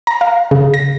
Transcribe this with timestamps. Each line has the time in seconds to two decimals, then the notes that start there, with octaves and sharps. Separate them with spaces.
0.07 A#5
0.21 F5
0.51 C#3
0.74 A#6